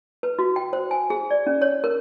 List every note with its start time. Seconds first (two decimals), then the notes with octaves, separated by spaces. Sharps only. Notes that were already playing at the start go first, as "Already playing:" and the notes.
0.23 B4
0.39 F#4
0.56 G5
0.73 C5
0.91 G#5
1.10 G#4
1.31 D5
1.47 C#4
1.62 C#5
1.84 A#4